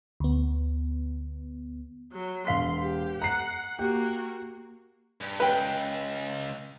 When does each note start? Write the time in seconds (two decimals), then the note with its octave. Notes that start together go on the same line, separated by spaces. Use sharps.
0.20 D2 B3
2.12 F#3
2.47 E1 F5 C6 B6
2.79 G4
3.22 F#5 A#5 C7
3.79 A#3 F#4 G4
5.21 G2
5.40 C#2 B4 G5